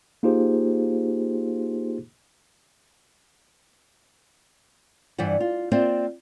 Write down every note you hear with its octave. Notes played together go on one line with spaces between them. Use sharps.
A#3 D#4 F4 G4 G#4 C5
G2 E3 C5 D5 F#5
F4
A#3 C4 F4 C5 D5 E5